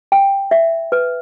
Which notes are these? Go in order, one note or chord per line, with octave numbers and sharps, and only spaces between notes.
G5
E5
B4